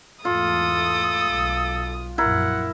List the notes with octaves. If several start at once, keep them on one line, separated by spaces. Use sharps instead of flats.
E2 G#2 A3 F4 A4 D#6
B1
A#1 F#2 E4 A#4 F#5